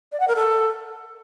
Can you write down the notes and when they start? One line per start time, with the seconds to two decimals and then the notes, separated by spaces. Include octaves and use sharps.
0.12 D5
0.20 F#5
0.28 A#4
0.36 A4